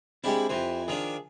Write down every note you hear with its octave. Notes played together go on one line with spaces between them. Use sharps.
G3 G#3 C4 D4 E4 G4
F2 E3 G4 C5
D#3 F3 D4 G#4